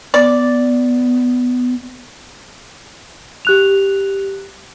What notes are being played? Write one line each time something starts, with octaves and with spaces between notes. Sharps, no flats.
B3 D5
G4 F#6 F7